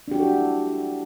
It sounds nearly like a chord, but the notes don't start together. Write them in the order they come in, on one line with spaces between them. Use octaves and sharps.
D4 G4 F#4 A4 E4